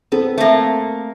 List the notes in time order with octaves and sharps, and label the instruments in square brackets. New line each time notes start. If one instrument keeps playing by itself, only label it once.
[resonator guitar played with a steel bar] B3 [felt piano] C4 A4
[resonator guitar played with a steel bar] A3 A#3